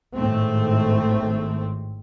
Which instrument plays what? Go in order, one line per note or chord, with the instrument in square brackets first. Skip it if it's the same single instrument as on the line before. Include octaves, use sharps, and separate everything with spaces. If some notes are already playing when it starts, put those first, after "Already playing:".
[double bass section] G#1 A2 A3 C4